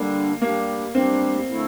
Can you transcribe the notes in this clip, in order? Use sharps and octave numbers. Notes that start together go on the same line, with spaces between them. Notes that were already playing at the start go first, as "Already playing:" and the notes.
Already playing: D3 G3 A#3 D4
G3 A#3 D4 G4
G3 C4 D4 G4
D3 A3 E4 A4